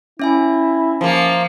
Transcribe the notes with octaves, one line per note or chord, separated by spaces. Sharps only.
C#4 E4 E5 G#5
F3 A#3